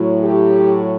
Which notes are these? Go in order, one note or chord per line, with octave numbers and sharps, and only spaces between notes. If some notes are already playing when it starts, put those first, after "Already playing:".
Already playing: A2 F#3
G4